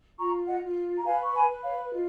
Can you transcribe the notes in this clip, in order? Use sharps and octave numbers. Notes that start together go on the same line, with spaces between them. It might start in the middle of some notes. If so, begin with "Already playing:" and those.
F4 A#5 C#6
D#5 F#5
F4
A#5
B4 F5 G#5
C#6
G#5 B5
B4
C#5 F5
F4 D#5